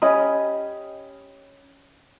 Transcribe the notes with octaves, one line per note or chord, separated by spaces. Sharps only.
C#4 G4 D#5 B5